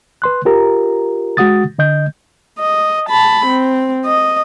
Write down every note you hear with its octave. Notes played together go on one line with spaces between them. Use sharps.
B4 C6 F#6
F4 G4 A#4 A#5
G#3 F#4 F#5 D#6 A6
D3 D#5 G6
D#5
A5 B5
C4
D#5